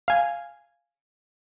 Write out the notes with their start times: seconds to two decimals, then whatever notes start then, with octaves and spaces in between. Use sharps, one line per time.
0.08 F5 G#5